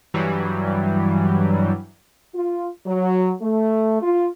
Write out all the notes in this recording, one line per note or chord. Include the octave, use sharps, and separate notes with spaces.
G2 E3 F#3 G3
F4
F#3
A3
F4